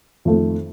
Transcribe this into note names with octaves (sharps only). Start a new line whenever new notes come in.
F2 D#3 A3